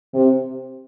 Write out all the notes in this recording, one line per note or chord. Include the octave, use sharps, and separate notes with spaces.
C3